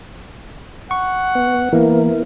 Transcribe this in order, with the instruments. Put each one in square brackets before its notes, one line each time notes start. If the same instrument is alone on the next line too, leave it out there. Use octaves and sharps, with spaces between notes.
[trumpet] F#5 [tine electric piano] C#6
[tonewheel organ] B3
[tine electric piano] E3 A#3 [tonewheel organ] B3 E4 A#4